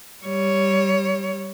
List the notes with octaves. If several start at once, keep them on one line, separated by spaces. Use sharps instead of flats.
G3 C#5